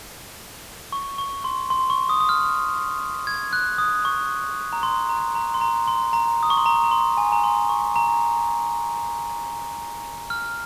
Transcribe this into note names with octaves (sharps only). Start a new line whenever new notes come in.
C#6
C#6
C6
C6
C#6
D#6
D#6
F6
G#6
F#6
D#6
C#6
A#5
C6
A#5
A#5
C6
A#5
C6
A#5
D#6
C#6
C6
A#5
A#5
C6
G#5
A#5
C6
C#6
A#5
F6